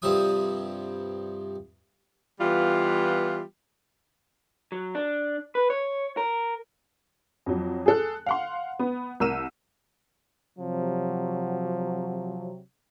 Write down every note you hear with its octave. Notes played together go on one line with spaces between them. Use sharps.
G2 C3 F3 G3 E5 D#6
E3 G3 B3 F4
F#3
D4
B4
C#5
A#4
F2 F#3
G#4 A4 F#6
F5 F#5 C6
B3
C2 A#4 E6 D#7 E7
C3 F3 F#3